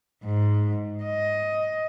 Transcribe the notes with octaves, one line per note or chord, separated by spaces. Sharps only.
G#2
D#5